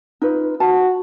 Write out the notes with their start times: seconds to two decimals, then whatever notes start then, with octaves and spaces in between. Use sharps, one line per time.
0.22 D#4 F4 B4
0.60 F#4 A5